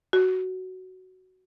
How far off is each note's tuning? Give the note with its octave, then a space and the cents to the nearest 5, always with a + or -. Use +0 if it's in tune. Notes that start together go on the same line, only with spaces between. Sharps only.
F#4 +10